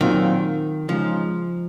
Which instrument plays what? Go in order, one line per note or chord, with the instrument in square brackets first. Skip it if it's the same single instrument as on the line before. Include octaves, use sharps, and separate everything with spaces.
[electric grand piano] A#2 F#3 C4 F4 [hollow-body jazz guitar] D#3
[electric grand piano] C#3 G#3 D#4 [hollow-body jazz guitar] F3